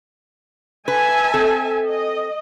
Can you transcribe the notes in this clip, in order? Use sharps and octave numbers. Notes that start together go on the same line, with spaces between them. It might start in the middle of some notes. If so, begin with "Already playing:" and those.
B4 E5 G#5 A5
C4 A4
D#5